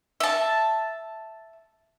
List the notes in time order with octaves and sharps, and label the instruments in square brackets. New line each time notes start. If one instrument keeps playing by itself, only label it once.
[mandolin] E5 A5